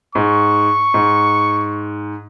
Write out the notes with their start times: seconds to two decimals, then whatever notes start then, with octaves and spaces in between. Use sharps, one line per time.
0.15 G#2 C#6
0.94 G#2